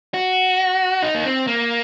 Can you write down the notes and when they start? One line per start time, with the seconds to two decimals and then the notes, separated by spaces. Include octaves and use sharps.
0.14 F#4
1.02 D#4
1.15 A#3
1.25 C4
1.47 A#3